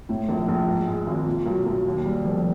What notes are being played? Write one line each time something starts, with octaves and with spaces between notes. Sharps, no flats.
A2
A#1
A#1
G#2
G#3
G#1
A#2
B1
B1
D#2
G3
F1